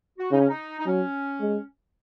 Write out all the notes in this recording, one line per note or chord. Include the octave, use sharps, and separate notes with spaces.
F#4
C#3 D#4
C#4
D#4
D#4
F#3 C#4
G#3